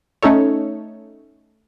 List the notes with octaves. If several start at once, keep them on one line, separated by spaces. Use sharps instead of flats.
A3 C#4 D#4 A4 C#5